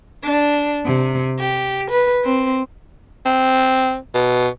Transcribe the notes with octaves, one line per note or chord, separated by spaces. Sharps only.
D4
C3
G4
B4
C4
C4
B2